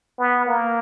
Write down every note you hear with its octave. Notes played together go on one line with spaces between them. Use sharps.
B3
A#3